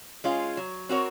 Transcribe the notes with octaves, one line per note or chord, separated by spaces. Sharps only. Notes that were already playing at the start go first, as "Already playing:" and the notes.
G#3 C#4 F4
F#3
C4 F#4 A#4 C#5